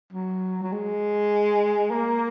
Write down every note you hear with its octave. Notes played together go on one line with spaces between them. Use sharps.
F#3
F#3
G#3
A#3